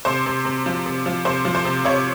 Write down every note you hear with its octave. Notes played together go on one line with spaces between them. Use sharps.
C3 C5
C3
C3
F3
C3
F3
C3 C5
F3
C5
C3
C3 C#5